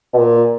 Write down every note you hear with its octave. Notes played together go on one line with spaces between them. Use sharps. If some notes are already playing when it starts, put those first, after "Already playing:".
B2
A#2